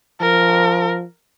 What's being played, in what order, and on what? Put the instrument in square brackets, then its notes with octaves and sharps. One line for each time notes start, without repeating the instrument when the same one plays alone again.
[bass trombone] F3 [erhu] A#4